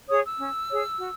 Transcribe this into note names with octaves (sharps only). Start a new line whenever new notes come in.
G#4 C#5 D#6
E6
C#4
G#4 C#5
F#4